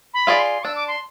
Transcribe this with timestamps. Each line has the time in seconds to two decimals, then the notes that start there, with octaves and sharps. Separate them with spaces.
0.14 B5
0.27 F4 G#4 D5
0.39 C6
0.64 D4 E6
0.75 D6
0.88 C6